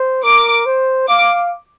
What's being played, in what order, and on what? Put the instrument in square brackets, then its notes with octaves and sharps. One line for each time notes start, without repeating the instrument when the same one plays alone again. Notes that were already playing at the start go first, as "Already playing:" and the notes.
Already playing: [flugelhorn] C5
[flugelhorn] A#4 [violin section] D6
[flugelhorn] C5
[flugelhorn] F5 [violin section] D6